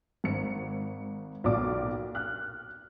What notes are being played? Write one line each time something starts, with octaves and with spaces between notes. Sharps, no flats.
G#1 C#7
B1 A#2 D5 D6
F6 F#6